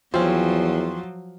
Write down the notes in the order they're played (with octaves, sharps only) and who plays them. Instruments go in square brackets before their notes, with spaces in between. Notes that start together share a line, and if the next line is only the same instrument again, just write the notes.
[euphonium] E2 [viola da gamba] F3 F#3 [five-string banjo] C4 C#4 [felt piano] F4